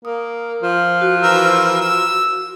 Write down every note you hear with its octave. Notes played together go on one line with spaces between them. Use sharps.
A#3 D#6
F3
F#4
E3 A#4 E6
E6